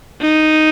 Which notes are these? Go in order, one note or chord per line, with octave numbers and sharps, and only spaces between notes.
D#4